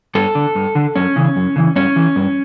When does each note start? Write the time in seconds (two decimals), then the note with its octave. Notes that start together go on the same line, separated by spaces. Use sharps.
0.15 G2 A4
0.35 D3
0.55 G2
0.75 D3
0.95 F#2 C#4
1.16 C#3 E3
1.36 F#2
1.56 C#3 E3
1.76 G2 C#4
1.96 E3
2.16 G2